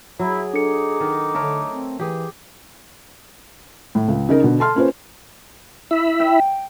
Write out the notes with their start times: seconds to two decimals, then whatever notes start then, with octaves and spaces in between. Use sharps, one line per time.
0.19 F#3 E4 G#4
0.53 D4 D#4 A4 D6 C#7
1.00 D#3
1.35 D3 A3 A#4 C#5
1.70 C4
2.00 E3 G4 G#4
3.95 A2
4.08 C#2
4.29 C#3 D#4 A#4
4.43 B2 D3
4.59 A4 A5 C6 F6
4.75 A#3 C#4 F4 B4 C5
5.91 E4 E5 B5
6.20 G5